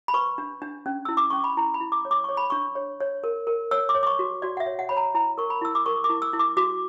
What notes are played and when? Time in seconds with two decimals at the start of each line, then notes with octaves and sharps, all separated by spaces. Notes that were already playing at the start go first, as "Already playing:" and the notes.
0.08 B5
0.14 B4 C#6
0.38 D4
0.62 D4
0.86 C#4
1.05 E4 E6
1.17 D6
1.30 C#4 C#6
1.44 B5
1.57 E4 A#5
1.74 B5
1.81 E4
1.92 D6
2.05 C#5
2.11 D6
2.24 C#5 C#6
2.37 B5
2.50 D4 C#6
2.75 C#5
3.00 C#5
3.24 A#4
3.47 A#4
3.71 C#5 E6
3.89 D6
3.95 C#5
4.03 D6
4.07 C#6
4.19 F#4
4.42 F#4 D5
4.57 F#5
4.60 E5
4.66 C#5
4.79 F#5
4.89 C#5 B5
4.97 A#5
5.14 E4 A#5
5.38 A#4 C#6
5.50 B5
5.61 E4 E6
5.75 D6
5.86 A#4 C#6
6.04 D6
6.10 E4
6.22 E6
6.33 E4
6.39 D6
6.57 F#4 D6